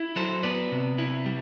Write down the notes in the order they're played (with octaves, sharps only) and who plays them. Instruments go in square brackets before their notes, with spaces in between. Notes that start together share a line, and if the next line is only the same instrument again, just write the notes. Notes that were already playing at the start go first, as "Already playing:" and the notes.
Already playing: [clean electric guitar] E4
F#3 A4 C5
B3 B4 D5
C3
E4
G3